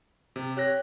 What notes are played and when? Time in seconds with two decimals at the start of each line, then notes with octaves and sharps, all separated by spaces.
0.36 C3
0.57 G4 C#5 F#6 A#6